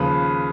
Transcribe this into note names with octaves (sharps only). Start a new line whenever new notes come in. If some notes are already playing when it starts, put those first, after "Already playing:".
Already playing: D#2 C#3 F3 B4